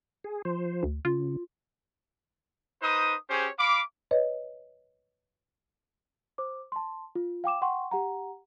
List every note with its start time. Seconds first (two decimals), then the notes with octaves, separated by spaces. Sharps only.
0.24 G#4
0.45 F3 C5
0.83 D2
1.05 C#3 F4
2.82 D#4 B4 C5 D#6
3.30 C#4 G4 G#4 C5 C#5
3.59 F5 B5 D6
4.11 B4 C#5 D#5
6.38 C5 D6
6.72 A5 C6
7.15 F4
7.44 F5 G5 D6 E7
7.62 F#5 G5 C6 C#6
7.91 G4 F#5 A#5